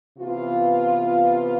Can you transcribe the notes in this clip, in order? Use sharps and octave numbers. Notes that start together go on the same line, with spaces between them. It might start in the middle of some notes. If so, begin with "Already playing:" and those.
C3 E3 B3 F4